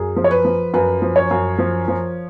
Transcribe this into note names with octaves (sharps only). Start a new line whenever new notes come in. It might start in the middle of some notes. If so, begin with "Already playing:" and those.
Already playing: F#2 G#4
F3
C#5
B4
F3
F#2 B4
F3
C#5
F#2
F3
F3